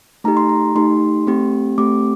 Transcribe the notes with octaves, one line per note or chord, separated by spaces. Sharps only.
A3 D#4 G4 A#5
C6
A#5
A3 D#4 G4 C6
A3 C4 G4
A3 C4 G4 D6